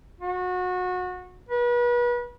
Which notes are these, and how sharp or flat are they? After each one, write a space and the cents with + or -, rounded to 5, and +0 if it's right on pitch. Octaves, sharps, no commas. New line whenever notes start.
F#4 -25
B4 -35